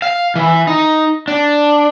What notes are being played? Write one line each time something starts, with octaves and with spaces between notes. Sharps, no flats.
F5
E3
D#4
D4